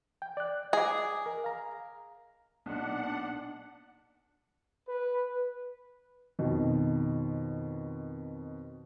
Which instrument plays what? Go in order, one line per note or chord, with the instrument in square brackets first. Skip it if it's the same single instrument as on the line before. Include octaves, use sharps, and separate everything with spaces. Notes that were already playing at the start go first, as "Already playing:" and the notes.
[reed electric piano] G5
D5 F#6
[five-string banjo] G#4 [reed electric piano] D#5 D6
[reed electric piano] A#4
F5 A#5
[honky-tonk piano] B1 A#2 [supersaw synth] D4 F#5
[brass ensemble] B4
[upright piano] F2 B2 D#3